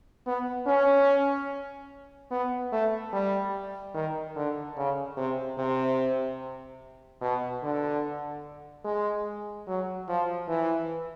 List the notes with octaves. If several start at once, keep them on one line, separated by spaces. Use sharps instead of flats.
B3
C#4
B3
A3
G3
D#3
D3
C#3
C3
C3
B2
D3
G#3
F#3
F3
E3